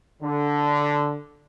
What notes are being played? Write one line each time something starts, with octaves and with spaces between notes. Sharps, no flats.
D3